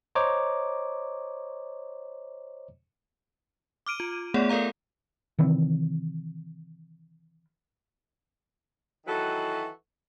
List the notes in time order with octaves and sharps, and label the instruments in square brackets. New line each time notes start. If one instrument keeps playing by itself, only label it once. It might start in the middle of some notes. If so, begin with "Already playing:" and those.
[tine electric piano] C5 C#5 D#5 A#5 D6
[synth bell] D6 F6 D7 D#7
F4
A3 B3 G#4 C#5 D5 F#5
A4 A#4 D5 F5 A#5
[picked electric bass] C3 D#3 E3 C4
[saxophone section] D#3 E3 F#3 F#4 A4 B4